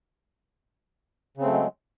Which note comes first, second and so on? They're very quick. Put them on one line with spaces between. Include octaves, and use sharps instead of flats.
C#3 C4 A3 F#3 G#3